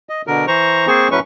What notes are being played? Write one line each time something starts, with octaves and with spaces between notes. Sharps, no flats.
D#5
B2 D3 A#4
E3 C5 A#5 C#6
A#3 C4 G#4 C5 C#6
A2 F#3 A3 C#4 B4 C#6